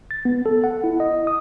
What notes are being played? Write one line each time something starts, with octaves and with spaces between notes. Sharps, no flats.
A6
B3
A4
F#5
E4
D#5
D#6